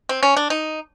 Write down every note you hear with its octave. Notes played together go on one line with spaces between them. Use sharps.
C4
C#4
D4
D#4